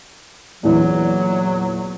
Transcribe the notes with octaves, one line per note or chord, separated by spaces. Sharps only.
E2 A#2 E3 F#3